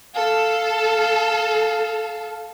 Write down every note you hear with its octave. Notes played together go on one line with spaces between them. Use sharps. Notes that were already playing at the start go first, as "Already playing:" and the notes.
A4 F5